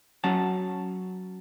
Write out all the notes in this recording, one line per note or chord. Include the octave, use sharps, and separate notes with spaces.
F#3 C#4 F#5 A5